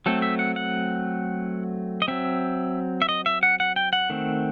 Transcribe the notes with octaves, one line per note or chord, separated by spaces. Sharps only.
F#3 A3 C4 A4
E5
F#5
F#5
D#5
F#3 C4 E5
E5
D#5
E5
F#5
F#5
G5
F#5
D#3 A3 C4